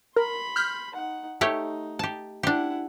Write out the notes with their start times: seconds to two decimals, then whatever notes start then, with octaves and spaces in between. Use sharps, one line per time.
0.16 A#4 B5 C6
0.56 F6 G6 B6
0.94 D#4 F#5
1.41 A3 D#4 G4 C#5
1.99 G4 A5
2.43 D4 E4 G4 F#5